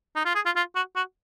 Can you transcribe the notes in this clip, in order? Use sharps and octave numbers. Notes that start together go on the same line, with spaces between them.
D#4
F4
G#4
F4
F4
F#4
F#4